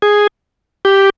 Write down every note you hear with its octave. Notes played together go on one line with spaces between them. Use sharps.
G#4
G4